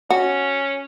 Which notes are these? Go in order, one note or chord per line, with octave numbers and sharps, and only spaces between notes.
C#4 F#4